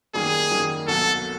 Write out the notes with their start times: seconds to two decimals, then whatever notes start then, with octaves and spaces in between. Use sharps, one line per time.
0.14 F#2 D#3 G3 A#3 G#4
0.51 F#2 D#3 G3 A#3
0.87 C2 B2 F#3 A#3 A4